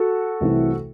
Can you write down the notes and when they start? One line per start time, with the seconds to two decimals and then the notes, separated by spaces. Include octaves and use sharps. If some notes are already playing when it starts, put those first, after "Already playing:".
Already playing: F#4 A4
0.40 C2 C3 E3 A3 E4